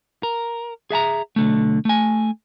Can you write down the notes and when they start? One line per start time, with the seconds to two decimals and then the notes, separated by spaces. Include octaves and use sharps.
0.23 A#4
0.90 G#4 E5 A5 A#5
1.36 B1 D3 A3
1.85 A3 G#5